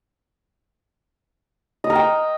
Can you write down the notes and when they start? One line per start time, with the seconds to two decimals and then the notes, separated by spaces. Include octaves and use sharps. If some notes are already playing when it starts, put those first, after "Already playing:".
1.84 D#5
1.90 A#4
1.95 G5